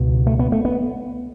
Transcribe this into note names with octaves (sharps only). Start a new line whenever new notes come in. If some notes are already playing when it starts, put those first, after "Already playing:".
Already playing: C#2 B2
A3
B3
A3
B3